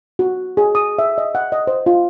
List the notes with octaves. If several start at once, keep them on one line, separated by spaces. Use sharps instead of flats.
F#4
G#4
D#6
E5
D#5
F#5
D#5
C5
F4